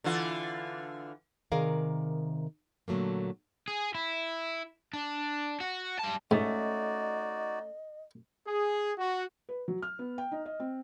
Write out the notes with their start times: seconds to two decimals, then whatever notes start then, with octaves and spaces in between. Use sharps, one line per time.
0.04 D3 E3 F4
1.52 C3 D#3 G#4 A#4 D5 F5
2.88 A#2 D3 F#3 A3 A#3
3.68 G#4
3.95 E4
4.93 D4
5.60 F#4
5.99 G3 A5
6.31 G#2 A3 C#4 D#4 F#4 D5 D#5
8.47 G#4
8.98 F#4
9.49 B4
9.68 F#3
9.82 F6
9.99 B3
10.18 G5
10.32 D#4
10.46 D#5
10.60 C4